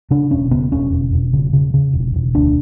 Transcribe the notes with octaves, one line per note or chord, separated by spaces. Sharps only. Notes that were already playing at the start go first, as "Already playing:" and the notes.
C#3 D4
E1 C#4
C#3 B3
E1 C#4
E1
E1
C#3
C#3
C#3
E1
E1
D2 D4